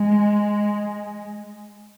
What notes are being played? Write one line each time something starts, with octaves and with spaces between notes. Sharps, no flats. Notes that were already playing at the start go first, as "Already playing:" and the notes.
Already playing: G#3